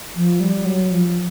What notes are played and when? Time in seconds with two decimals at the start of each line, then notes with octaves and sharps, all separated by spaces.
0.16 F3
0.40 G3
0.65 F#3
0.91 F3